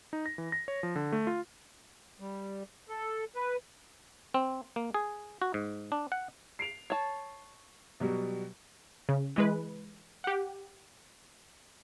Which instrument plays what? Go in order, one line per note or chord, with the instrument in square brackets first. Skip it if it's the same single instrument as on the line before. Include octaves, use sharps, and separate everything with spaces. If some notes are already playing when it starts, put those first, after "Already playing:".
[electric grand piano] D#4
A#6
E3
A#6
C#5
F3
D3
A3
F4
[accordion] G3
A4
B4
[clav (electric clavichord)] C4
A#3
G#4
F#4
G#2
D4
F#5
[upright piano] C7 D7 F7
[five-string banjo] C#5 A5
[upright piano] B2 F#3 G3
[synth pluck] C#3
E3 G#3 B4
G4 F#5